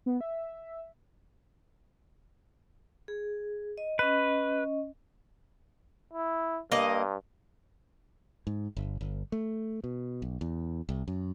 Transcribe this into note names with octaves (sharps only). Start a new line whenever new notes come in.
B3
E5
G#4
D#5
C#4 B4 D#5
E4
G2 A#3 D#5
G#2
G1
G1
A3
B2
B1
E2
C2
F#2